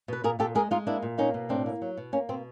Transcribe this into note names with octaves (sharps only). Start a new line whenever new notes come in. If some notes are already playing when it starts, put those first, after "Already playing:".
B2 B4
A#2 G#4 A#4
A#2 G4 A4
G#3 G#4 A#4
G#3 D#4 F4
A#3 D4 E4
A#2
A#3 C#4 D#4
B2
A2 C4 D4
A#3
F#3
B2
A#3 C#4
B2 C4